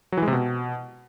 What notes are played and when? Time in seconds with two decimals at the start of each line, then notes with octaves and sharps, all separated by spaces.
0.12 F#3
0.17 E3
0.22 G#3
0.27 C3
0.33 B2